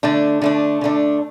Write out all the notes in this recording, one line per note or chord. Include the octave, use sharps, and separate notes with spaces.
D3 A3 D4
D3 A3 D4
D3 A3 D4